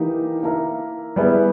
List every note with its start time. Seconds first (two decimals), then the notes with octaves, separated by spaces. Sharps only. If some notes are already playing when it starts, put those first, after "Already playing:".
Already playing: E3 A#3 D#4 G4 A#4
0.43 A#3 E4 A#4 E5
1.16 G3 B3 E4 G#4